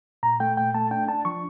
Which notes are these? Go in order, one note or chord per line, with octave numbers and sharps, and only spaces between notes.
A#2 A#5
A3 G5
A#2 G5
A3 A5
D4 G5
D4 A5
F3 C#6